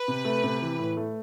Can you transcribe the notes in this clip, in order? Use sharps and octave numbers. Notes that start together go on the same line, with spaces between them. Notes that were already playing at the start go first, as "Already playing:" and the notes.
Already playing: B4
C3
A3
C3
E3
A2
A3